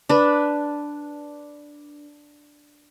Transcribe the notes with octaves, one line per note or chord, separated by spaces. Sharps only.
D4 B4